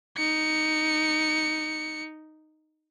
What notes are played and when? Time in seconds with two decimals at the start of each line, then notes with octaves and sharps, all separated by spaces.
0.17 D#4 C#7